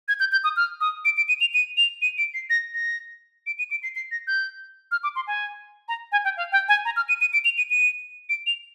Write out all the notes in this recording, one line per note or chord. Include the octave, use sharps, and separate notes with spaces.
G#6
G6
G6
D#6
F6
D#6
D7
D7
D#7
F7
D#7
F7
D#7
D7
C7
A#6
A#6
D7
D#7
D7
C7
C7
A#6
G6
F6
D6
C6
G#5
A#5
G#5
G5
F5
G5
G#5
A#5
F6
D#7
D#7
D7
F7
D#7
D#7
D7
F7